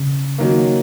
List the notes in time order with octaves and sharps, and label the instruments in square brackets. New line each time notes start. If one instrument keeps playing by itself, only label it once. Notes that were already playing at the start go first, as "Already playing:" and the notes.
Already playing: [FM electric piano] C#3
[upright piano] D#3 F#3 A#3